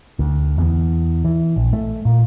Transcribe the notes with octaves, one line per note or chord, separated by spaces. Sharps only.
D2
E2
E3
A#1
A3
A#2